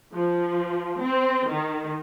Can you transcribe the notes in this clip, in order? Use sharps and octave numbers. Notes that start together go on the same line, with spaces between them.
F3
C4
D#3